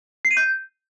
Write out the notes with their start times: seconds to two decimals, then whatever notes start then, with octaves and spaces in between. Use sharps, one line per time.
0.25 C7
0.31 D#7
0.37 G6